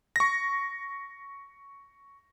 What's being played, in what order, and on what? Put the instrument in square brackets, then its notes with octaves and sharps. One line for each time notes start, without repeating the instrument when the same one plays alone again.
[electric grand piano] C#6 A#6